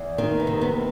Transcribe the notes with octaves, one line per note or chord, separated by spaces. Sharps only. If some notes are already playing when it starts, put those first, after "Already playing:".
Already playing: E2
D#3 C4
B3
C3
B3